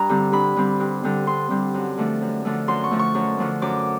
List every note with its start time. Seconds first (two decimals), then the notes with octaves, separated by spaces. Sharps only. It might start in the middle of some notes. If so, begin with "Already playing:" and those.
Already playing: G2 A#5
0.09 D3 G3 C4
0.32 G2 B5
0.56 D3 G3 C4
0.80 G2
1.04 D3 G3 C4
1.27 G2 C6
1.50 D3 G3 C4
1.74 F#2
1.98 D3 F3 A3
2.21 F#2
2.45 D3 F3 A3
2.68 F#2 C6
2.84 C#6
2.91 D3 F3 A3
2.99 C#6
3.15 F#2
3.39 D3 F3 A3
3.62 F#2 D6